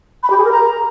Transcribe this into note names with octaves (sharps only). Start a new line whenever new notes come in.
B5
G4
G#4
A#4
A#5